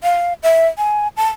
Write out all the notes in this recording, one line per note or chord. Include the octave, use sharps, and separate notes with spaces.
F5
E5
G#5
A5